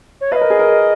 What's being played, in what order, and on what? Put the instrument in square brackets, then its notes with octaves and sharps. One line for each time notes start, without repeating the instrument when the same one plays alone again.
[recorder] C#5
[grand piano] B4 [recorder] F5
[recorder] D#5
[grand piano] A#4
G#4
A#4